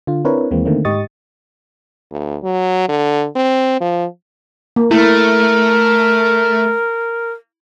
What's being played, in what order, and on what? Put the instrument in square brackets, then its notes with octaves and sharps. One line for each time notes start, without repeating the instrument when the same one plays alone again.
[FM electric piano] D3 F4
C4 D4 E4 A#4 B4 C#5
D#2 E3 G#3 A#3 C4
D3 D#3 A3 A#3 C4
G#2 G4 D#5 C#6 D#6 A6
[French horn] D2
F#3
D3
C4
F3
[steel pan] A#3
[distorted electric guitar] A3 [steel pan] E4 [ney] A#4